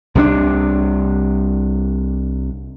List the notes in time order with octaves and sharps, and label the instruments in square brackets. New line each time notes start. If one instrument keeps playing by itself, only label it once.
[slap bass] C2 C3 F#3 D4